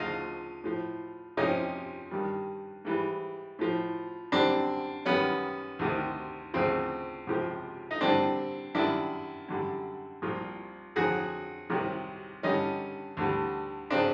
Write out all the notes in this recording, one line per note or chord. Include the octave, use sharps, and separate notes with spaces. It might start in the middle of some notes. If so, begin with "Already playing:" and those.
Already playing: D2 C#3 F3 D#4 F4
A2 F3
F2 C3 F3 C#4 D#4
G2 D#3 G3
G#2 E3 G3
A2 F3
F#2 D3 G3 C4 D4
F#2 D#3 G3 B3 C#4
D2 C3 D#3
D2 C#3 F3 C4
C#2 C3 F3
D#4
G2 D3 G3 C4 D4
F#2 D#3 G3 D4 E4
F#2 D3 G3
C2 A#2 F3
F2 D3 F#3 F#4 G#4
C2 C3 D#3 F#3
G2 D3 G3 C#4 D#4
D2 D3 G3
C#3 F#3 C4 D4